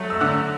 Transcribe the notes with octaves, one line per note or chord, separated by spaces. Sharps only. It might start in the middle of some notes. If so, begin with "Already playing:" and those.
Already playing: F#3 A3
E6
D3 F#6